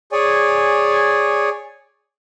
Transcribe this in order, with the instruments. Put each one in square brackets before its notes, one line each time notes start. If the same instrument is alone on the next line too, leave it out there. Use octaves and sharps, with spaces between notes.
[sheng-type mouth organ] G#4 C#5 D5 G#5